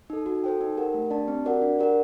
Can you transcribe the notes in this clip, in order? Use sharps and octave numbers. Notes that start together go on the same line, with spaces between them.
D#4 A4
F#4
A4 C5 G5
D#4
G4 A#4 F#5
A3
D4 G4 D5 A5
C4
F#4 A#4 D5 F#5
D4
G4 A#4 D5 F#5